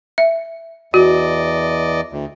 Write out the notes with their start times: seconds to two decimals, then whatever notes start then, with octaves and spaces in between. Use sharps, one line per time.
0.18 E5
0.94 E2 F#4 D5 D#5
2.12 D2